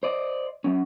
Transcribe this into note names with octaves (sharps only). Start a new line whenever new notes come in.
C5 D5 D#5
F#3 C#4